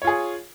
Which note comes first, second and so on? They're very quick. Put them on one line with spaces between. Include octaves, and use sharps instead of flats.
C#5 F4 G#4